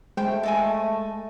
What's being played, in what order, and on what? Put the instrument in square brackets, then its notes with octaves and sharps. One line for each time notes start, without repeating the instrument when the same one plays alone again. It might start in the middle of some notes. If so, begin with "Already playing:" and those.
[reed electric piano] G#3 [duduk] A3 [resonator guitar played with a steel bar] C5 G5
[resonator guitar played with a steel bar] A4 D#5 G#5